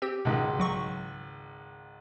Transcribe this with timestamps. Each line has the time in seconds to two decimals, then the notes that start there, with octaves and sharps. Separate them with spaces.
0.02 C4 G4
0.25 G#1 C#2 B2
0.58 B1 F#3 C#6